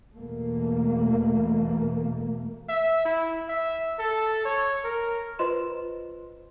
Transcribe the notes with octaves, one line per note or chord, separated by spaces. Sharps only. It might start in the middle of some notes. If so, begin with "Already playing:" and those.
E2 B2 A3 A#3
E5
E4
E5
A4
C#5
A#4
F4 B4 C5 D#5 C6 E7